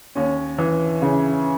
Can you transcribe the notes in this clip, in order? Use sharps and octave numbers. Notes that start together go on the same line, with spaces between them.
D#2 C#4
E3
C#3